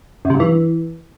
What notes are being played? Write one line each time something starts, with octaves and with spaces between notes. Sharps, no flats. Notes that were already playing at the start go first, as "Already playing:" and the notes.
F#2
C3
G2
E3